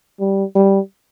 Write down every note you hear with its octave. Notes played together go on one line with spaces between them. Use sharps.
G3
G3